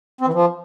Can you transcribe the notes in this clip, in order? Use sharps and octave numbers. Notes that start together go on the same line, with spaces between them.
C4
E3
F3